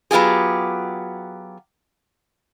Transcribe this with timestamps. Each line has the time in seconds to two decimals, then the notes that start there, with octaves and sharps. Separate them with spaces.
0.11 F#3 B3 F4 G4 G#4